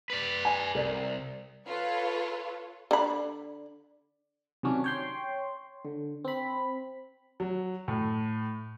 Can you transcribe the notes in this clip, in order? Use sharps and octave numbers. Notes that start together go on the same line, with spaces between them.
B4 D5
G#5
C2 A#4 D5
F4 A4 B4 C#5
D3 B5
C3 D#3 F#3 C#4 D4
C#5 G5 C6
D3
C4 B5
F#3
A2